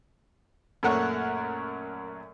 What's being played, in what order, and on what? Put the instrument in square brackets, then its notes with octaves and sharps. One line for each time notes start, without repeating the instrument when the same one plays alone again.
[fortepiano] F#2 A#2 A3 A#4 C#5 F#5